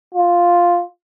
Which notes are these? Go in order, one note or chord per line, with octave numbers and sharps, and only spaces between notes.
F4